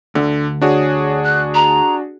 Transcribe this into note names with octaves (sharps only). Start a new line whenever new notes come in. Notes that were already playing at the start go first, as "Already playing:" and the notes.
D2 D3
D4 F#4 G#4 C#5
F#6
A#5